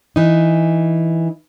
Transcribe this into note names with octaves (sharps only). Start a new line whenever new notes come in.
E3 D#4